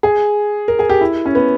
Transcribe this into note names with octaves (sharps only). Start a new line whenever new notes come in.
G#4
A#4
G#4
G4
E4
C#4
B3